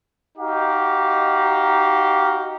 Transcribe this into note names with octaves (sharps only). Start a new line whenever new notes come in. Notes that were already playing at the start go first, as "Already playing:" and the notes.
D#4 F#4 G4 F5